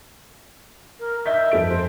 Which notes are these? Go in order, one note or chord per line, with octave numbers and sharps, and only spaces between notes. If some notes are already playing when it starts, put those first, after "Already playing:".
A#4
D#5 E5 G6 B6
F2 A4 D7
C5